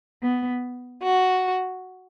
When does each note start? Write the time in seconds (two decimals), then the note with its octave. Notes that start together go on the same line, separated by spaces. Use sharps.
0.22 B3
1.03 F#4